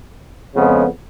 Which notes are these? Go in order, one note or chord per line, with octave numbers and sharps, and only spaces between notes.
F2 C#3 G#3 B3